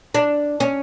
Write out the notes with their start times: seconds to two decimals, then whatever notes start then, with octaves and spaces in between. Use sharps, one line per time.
0.14 D4
0.60 C#4